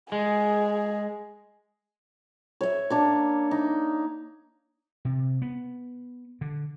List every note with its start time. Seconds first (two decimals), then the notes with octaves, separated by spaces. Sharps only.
0.12 G#3 G#4
2.61 C#5 E5
2.90 A#3 D4 C#5
3.51 D#4
5.05 C3
5.42 B3
6.41 D3